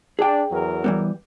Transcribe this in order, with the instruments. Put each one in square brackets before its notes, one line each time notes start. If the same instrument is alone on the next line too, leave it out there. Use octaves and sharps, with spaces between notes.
[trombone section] D4 [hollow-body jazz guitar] G#4 G5
[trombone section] E2 F#3 A#4
[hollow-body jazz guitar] E3 G3 B3